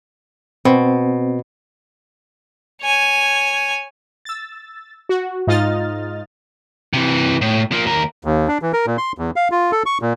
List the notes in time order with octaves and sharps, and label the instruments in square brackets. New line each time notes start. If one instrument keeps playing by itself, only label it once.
[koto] B2 [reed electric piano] C4
[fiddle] C#5 G#5
[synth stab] E6 A6
F#4
G#2 D#4 F4 D#5 F6 A6
[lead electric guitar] C3 E3
A2
F3 A#3
D#2 A#4
[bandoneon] D#2
D4
E3
A#4
A#2
C6
E2
F5
F4
A4
C#6
A#2